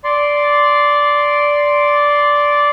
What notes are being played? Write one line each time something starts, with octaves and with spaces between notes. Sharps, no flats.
D5 C6